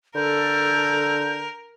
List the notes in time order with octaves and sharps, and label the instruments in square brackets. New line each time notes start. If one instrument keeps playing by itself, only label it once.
[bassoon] D3 [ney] A4 [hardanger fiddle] A#4 [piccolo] G6